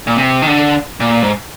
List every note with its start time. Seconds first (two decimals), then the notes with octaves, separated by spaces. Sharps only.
0.07 A#2
0.17 C3
0.42 D#3
0.47 D3
1.00 A#2
1.23 G#2